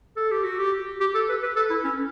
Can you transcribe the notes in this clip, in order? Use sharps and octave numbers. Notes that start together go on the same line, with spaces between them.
A4
G4
F#4
G4
G4
A4
B4
B4
A4
E4
C#4